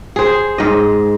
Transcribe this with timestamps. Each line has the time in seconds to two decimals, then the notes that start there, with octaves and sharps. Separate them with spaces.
0.16 G#4 C5
0.58 G#2 D#5